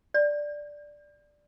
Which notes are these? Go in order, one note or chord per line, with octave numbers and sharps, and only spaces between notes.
D5